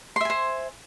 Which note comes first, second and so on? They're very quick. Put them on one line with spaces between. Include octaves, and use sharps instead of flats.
C6 E5 G#5 C5